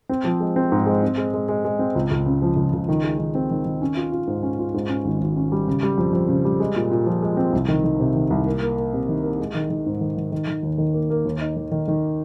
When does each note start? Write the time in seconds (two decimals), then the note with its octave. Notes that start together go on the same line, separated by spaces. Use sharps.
0.09 C4
0.24 F3
0.40 G#3
0.56 C4
0.72 G#2
0.86 G#3
1.03 C4
1.17 G#3
1.34 G#3
1.48 G#3
1.65 G#3
1.79 C4
1.96 C#2
2.11 C#2
2.26 C#3
2.42 F3
2.57 C#2
2.73 C#2
2.89 D#3
3.03 G#3
3.19 D#3
3.35 C4
3.51 D#3
3.65 D#3
3.82 C#4
3.97 F4
4.12 F4
4.27 G#2
4.43 C#4
4.59 F4
4.74 G#2
4.89 C#4
5.05 G#1
5.21 G#1
5.37 C#4
5.52 G3
5.67 C#3
5.83 G3
5.98 F2
6.13 F2
6.29 C#3
6.45 G3
6.60 G#3
6.76 A#2
6.91 A#2
7.06 F3
7.22 G#3
7.37 C4
7.53 C2
7.68 D#3
7.84 D#3
8.00 C3
8.16 D#3
8.30 C2
8.46 A#3
8.62 A#3
8.77 A#3
8.93 C3
9.08 D#3
9.23 A#3
9.40 G#3
9.55 D#3
9.70 D#3
9.86 G#2
10.01 D#3
10.17 D#3
10.32 D#3
10.48 D#3
10.63 D#2
10.78 D#3
10.94 A#3
11.10 A#3
11.25 D#2
11.41 D#4
11.56 D#3
11.72 D#3
11.88 D#3